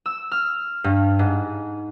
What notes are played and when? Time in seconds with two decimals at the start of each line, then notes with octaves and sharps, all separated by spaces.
0.06 E6
0.32 F6
0.84 G2
1.19 G#2